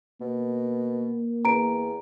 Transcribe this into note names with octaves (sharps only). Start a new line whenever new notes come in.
B2 A#3
E2 A#5 D7